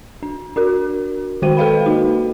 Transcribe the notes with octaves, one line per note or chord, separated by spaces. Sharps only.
D4
D4 F#4 A#4
D#3 G#3 F#4 C5 G5 D#7
A4 B4 D#5 F5 G5 B5
A#3 D#4 F#4